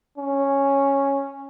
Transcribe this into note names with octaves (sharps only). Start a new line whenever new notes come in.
C#4